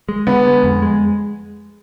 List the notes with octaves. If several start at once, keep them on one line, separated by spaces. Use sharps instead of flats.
G#3
D3 B3
G#3
F2
G#3